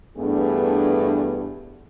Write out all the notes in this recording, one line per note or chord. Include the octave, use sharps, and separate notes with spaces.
E2 G2 A3 B3 D4 G#4